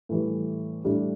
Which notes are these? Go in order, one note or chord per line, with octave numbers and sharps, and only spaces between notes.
A2 E3 G3
A2 G3 D4 G4